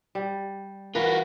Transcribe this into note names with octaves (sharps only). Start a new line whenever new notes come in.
G3
E3 F4 F#4 A#4 B4